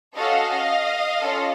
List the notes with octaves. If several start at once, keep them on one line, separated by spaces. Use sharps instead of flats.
C#4 F#4 A4 D#5 F5
C#4 F4 A4